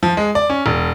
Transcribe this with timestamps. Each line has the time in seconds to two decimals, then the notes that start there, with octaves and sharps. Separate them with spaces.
0.03 F3
0.17 G#3
0.35 D5
0.50 C#4
0.66 E1